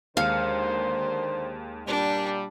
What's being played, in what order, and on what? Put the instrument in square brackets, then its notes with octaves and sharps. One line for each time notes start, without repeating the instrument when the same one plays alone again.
[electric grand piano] D#2 G#3 C#7 [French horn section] D3 A#4 C5 [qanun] F5
[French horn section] A#2 G3 [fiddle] D4